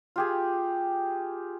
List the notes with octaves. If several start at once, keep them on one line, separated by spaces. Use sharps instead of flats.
F4 G4 G#4